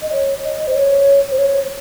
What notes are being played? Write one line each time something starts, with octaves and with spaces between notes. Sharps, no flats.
D#5
C#5
D#5
C5
C#5
C5
C#5